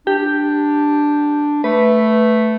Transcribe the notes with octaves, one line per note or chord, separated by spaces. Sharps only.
D4 G4
A3 B4